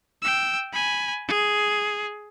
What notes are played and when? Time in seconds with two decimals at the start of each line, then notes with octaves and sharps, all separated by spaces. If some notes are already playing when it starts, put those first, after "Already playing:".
0.22 G5 E6
0.73 G#5 B5
1.28 G#4